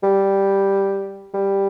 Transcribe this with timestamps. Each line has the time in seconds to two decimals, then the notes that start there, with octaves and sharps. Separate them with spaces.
0.03 G3
1.34 G3